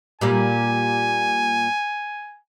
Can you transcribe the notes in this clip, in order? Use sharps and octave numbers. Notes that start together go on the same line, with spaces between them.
A#2 G3 A#3 G#5